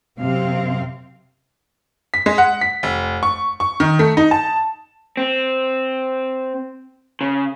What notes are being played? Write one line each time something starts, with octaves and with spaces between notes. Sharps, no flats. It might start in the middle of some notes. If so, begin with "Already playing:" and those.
F#2 C3 C4 F5
B6
G#3
F#5
B6
F1
C#6
C#6
D#3
A3
D#4
A5
C4
C#3